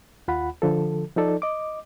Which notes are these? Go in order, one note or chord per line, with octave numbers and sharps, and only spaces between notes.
D#2 F4 F#5 B5
D3 F3 A4
F3 D#4 A4 D5
D#5 D6